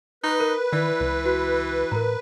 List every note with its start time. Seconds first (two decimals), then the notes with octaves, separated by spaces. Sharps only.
0.24 D#4 B4
0.40 A#4
0.72 D#3 E3 D5
1.00 C#2
1.26 F#4
1.92 A2 A#4 A#5